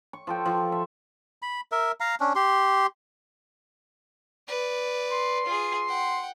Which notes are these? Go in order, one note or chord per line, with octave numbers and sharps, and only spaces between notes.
C#6
F3 A4 G5
F3
E5
B5
A#4 E5
F5 A#5
C#4 D4
G4 C6
B4 D5
C6
F4 G#4
F#5 G5